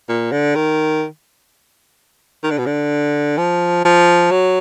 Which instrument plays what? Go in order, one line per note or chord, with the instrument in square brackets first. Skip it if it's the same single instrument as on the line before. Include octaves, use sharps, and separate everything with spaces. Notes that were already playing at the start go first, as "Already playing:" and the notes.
[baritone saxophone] A#2
D3
D#3
D#3
D3
B2
D3
F3
F3
F#3